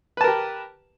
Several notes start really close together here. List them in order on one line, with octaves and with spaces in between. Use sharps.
B4 A5 A#4 G4